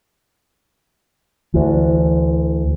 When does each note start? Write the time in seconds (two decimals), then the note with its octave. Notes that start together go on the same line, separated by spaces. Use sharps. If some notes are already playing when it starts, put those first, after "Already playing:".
1.54 D2 E3